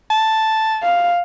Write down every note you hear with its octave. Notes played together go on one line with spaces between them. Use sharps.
A5
F5